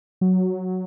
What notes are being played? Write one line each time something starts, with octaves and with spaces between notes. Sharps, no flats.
F#3